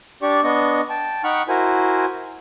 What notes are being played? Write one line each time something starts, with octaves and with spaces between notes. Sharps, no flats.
D4 G4 D5 C#6
B3 D4 D#5 C#6
G5 A5
D#4 F#5 G5 B5 C#6 F6
E4 F#4 A#4 C5 G#5